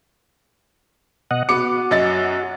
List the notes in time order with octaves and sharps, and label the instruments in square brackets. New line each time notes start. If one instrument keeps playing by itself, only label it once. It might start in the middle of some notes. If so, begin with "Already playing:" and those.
[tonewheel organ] B2 D#5 F#5
[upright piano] B3 D6 C#7 [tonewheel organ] F#4
[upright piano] F#2 D#5 A6